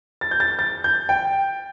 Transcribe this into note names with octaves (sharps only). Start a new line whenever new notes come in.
A6
G6
A6
A6
G6
G5